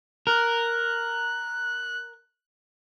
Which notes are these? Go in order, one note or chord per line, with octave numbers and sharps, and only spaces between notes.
A#4 F#6